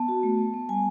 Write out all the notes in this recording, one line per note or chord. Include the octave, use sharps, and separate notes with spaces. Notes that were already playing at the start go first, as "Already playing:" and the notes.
Already playing: B3 A5
F#4
A3
B3
B3
G3 G#5